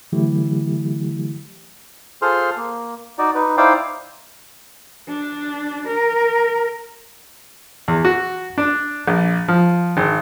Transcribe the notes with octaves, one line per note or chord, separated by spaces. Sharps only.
D3 E3 F#3 A3 E4 G4
F4 G#4 A4 C5 C6 F6
A#3
D#4 F#4 D5
D#4 B4
D#4 E4 C5 D5 F5 G5
D4
A#4
E2
F#4
D4
A#1
F3
G#1